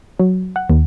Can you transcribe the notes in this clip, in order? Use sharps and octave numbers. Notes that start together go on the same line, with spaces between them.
F#3
F#5
D#2